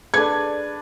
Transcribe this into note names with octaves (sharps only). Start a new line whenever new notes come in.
D4 G#4 A4 B4 D5 G#6